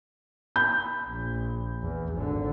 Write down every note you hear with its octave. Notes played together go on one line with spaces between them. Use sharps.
B5 G6
A#1
E2
G#1 D3